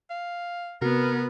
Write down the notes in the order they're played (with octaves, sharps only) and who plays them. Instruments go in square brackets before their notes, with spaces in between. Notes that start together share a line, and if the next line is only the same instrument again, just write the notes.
[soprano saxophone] F5
[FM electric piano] C3 F#4 F6 [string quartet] B3 [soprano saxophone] A#4